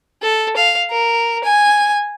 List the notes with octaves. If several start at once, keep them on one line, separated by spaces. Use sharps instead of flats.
A4
F5
A#4
G#5